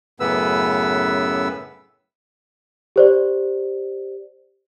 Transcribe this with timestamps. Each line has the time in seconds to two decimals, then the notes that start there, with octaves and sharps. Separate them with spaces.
0.20 F#2 A2 C#3 B3 B4 E6
2.96 G4 C5 D5